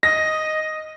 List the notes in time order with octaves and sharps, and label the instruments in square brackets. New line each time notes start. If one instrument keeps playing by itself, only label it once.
[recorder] D#5 [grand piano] A#6